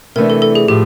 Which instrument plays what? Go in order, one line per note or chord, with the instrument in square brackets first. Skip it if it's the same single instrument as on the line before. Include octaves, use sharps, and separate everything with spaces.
[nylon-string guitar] C3 E3 A3 D4 [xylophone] A#4
[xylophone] A4
A4
G#4
[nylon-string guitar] A2 F3 [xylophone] G4